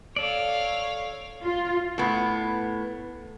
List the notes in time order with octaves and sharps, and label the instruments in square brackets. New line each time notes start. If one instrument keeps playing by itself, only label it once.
[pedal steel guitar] A4 D5 [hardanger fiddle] C#5 F5
[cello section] F4
[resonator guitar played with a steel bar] A2 B3